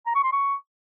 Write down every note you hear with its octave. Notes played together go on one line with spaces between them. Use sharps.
A#5
C#6
C6
C#6